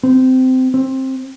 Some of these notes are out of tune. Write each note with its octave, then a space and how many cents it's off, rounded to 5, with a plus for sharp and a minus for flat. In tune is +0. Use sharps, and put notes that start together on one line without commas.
C4 -20
C4 +15